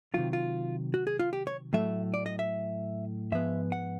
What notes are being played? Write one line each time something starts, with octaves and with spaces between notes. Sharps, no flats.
C3 D#3 F#3 F4
F4
F#4
G#4
F4
G4
C#5
A2 F#3 A3 E5
D5
D#5
E5
G#2 F3 G#3 B3 E5
F#5